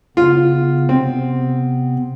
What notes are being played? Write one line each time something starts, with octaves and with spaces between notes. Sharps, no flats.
C#3 B3 F4
C3 B3 C4